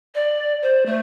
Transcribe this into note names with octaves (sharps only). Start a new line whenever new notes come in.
D5
C5
A3